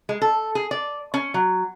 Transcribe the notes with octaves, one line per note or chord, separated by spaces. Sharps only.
G#3
A4
G#4
D5
C#4
F#3